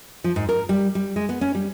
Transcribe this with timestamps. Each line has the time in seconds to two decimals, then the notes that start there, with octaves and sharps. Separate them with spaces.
0.24 F3
0.36 G#2
0.49 A#4
0.69 G3
0.95 G3
1.16 G#3
1.29 B3
1.41 C#4
1.55 G3